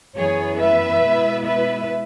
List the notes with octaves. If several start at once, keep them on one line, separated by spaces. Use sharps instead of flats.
F#2 E3 B3 G#4 C#5
B4 E5
B2 G#3 B3 E4
B4 E5